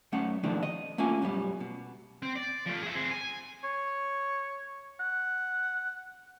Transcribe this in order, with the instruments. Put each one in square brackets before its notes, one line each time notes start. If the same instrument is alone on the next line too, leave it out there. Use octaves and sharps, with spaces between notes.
[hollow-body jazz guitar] F#2 A3 C#4 F#5
B2 D#3 F3 A3 D4
D#5
A3 A#3 C#4 F4 G#5
F#2 B2 G3
B2
[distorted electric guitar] C4
D5
F3 A3
G#4 E5
C4 G#4
G#5
[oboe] C#5
F#5